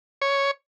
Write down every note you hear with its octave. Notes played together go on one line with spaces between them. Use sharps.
C#5